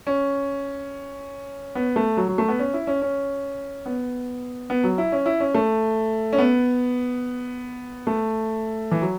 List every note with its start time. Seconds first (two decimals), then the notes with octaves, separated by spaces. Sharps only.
0.07 C#4
1.75 B3
1.96 A3
2.17 F#3
2.28 F#3
2.38 A3
2.48 B3
2.59 C#4
2.74 E4
2.87 C#4
3.02 C#4
3.86 B3
4.70 B3
4.84 F#3
4.98 E4
5.12 C#4
5.26 E4
5.40 C#4
5.54 A3
6.33 C#4
6.38 B3
8.07 A3
8.91 E3
9.02 F#3